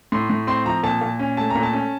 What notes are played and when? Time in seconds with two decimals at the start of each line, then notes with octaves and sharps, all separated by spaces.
0.12 A2 C6
0.30 A2
0.47 C4 C6
0.66 F3 A#5
0.83 A#2 A5
1.01 A#2
1.19 C#4
1.37 A3 A5
1.50 A#5
1.55 A#2
1.63 A5
1.73 C#4